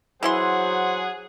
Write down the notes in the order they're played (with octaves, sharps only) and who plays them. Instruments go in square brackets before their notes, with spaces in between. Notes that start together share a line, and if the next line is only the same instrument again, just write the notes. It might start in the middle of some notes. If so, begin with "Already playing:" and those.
[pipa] E3 E4 C6 [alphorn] F#3 [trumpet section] G#4 F#5 [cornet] C5